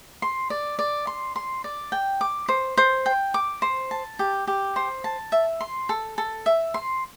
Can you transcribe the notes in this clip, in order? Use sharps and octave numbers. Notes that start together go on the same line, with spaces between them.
C6
D5
D5
C6
C6
D5
G5
D6
C5
C5
G5
D6
C5
A5
G4
G4
C5
A5
E5
C6
A4
A4
E5
C6